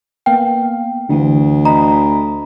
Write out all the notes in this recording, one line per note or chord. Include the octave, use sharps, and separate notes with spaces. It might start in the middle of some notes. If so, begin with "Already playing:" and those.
A#3 B3 F5 G5
D2 D3 E3
D#5 A#5 B5